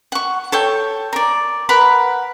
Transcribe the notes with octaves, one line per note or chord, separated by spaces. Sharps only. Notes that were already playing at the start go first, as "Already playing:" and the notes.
F#5 C#6
A4 C#5 G5
A#4 D5
A#4 B4 F#5 B5